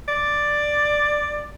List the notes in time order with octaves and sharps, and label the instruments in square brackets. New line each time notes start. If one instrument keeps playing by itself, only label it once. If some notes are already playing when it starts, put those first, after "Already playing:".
[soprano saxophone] D5